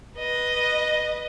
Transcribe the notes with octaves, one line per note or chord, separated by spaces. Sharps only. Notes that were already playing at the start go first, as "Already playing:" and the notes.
B4 D#5